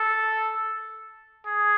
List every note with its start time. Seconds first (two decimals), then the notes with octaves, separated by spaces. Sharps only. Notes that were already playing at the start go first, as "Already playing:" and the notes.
Already playing: A4
1.47 G#4